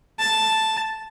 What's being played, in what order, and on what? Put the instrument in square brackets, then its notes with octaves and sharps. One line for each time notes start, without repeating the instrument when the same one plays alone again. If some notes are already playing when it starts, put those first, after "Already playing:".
[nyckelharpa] A5